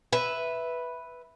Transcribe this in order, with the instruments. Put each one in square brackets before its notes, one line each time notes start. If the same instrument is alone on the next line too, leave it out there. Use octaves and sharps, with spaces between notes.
[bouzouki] B4 E5